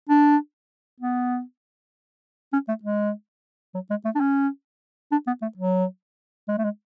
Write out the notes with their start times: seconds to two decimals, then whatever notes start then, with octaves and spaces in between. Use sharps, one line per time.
0.09 D4
1.00 B3
2.53 C#4
2.68 A3
2.83 G#3
3.75 F#3
3.90 G#3
4.05 A3
4.15 D4
4.20 C#4
5.12 D4
5.27 B3
5.42 A3
5.57 F#3
6.49 G#3
6.58 A3
6.64 G#3